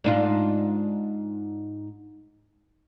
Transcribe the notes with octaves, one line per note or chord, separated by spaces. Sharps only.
G#2 D4 F4